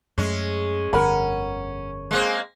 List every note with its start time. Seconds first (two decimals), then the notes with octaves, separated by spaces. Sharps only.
0.18 F#2 G#3 A3 C#4
0.93 G1 F2 D3 C#4 A#4 F#5 B5
2.11 G#3 A#3 C4